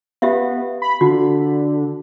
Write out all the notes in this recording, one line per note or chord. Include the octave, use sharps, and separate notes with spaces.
B3 G4 E5 F5
B5
D3 F#4